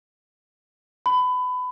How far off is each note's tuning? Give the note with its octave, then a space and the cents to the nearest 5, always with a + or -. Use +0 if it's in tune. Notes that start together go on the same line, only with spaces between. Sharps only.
B5 +25